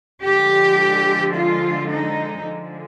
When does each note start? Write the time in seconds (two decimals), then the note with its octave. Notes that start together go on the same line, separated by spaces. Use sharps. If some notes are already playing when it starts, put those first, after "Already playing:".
0.22 D3 F3 G#3 G4
1.34 F4
1.90 D#4
2.45 D3 F3 G#3